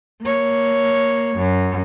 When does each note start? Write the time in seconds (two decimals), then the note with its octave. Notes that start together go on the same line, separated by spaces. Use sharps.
0.22 A#3 C#5
1.37 F#2